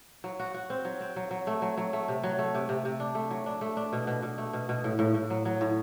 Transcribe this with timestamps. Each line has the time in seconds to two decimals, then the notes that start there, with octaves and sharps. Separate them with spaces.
0.24 F#3
0.39 F#4
0.54 F#4
0.70 C4
0.85 F#3
1.01 C4
1.16 F#3
1.31 F#3
1.47 A3
1.62 F#3
1.78 F#3
1.93 A3
2.08 C3
2.24 F#3
2.39 A3
2.55 C3
2.69 C3
2.85 C3
3.00 D4
3.15 A3
3.31 F#3
3.46 D4
3.61 A3
3.77 D4
3.93 B2
4.07 B2
4.23 B2
4.38 A3
4.53 B2
4.69 B2
4.84 A2
4.99 A2
5.14 A2
5.30 F#3
5.45 F#3
5.61 A2